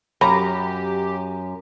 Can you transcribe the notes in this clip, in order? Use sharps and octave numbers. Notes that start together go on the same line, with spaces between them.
F#2 G4 F5 A#5 B5